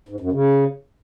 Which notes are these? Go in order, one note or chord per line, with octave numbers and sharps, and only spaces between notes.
G#2
F#2
C#3